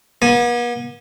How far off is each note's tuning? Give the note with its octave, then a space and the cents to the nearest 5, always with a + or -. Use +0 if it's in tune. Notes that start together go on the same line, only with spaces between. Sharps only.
B3 -45 G#5 +0